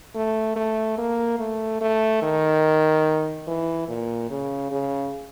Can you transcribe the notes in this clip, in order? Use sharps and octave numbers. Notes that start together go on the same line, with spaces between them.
A3
A3
A#3
A3
A3
D#3
E3
A#2
C#3
C#3